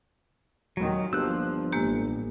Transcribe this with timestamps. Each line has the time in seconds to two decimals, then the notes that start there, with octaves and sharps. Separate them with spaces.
0.77 D#2 A#2 D#3 F#3
1.13 G1 F3 A#3 G4 E6 F#6
1.72 A1 A2 G#3 A#3 G4